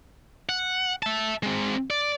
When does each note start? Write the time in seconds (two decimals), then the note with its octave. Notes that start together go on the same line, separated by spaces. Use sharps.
0.49 F#5
1.03 E5 A5
1.43 G#3 C4
1.90 D5